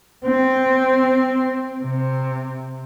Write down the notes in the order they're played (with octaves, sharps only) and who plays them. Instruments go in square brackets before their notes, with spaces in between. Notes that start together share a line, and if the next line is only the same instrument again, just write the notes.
[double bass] C4
C3